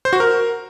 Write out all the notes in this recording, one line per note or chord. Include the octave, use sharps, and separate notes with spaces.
C5
F#4
A#4